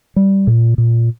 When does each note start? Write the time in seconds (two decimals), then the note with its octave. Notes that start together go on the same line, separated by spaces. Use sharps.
0.16 G3
0.47 A#2
0.78 A#2